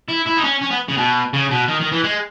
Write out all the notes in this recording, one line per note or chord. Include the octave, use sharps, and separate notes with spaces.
E4
E4
D#4
C#4
C#4
B3
C#3
B2
C#3
B2
D#3
D#3
E3
G#3